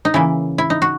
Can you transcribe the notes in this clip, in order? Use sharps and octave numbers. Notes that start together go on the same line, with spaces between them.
D#4
C#3 E3 A#3 E4
E4
D#4
F#4